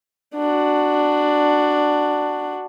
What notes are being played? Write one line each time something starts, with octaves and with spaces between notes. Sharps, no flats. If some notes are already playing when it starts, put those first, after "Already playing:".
D4 F#4